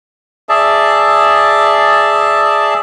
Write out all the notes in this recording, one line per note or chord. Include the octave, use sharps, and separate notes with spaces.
G#4 D5 E5 A5